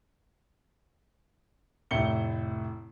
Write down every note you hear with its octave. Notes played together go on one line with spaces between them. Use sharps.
F1 A2 E4 C#7 G7